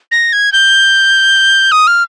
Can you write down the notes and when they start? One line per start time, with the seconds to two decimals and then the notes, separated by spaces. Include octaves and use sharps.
0.11 A#6
0.33 G#6
0.52 G6
1.72 D#6
1.87 F6